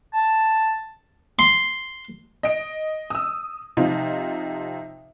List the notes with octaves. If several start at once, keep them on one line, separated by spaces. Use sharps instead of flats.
A5
C6
D#5 D7
D#6 E6
C3 F3 D#4 F4